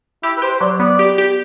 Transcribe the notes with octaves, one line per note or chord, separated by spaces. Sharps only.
E4 G4
B4
G4 C5
C5
F#3 D5
B3 D5
G4
G4